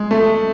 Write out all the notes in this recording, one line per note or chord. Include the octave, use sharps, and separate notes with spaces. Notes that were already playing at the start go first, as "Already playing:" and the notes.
Already playing: G#3
A3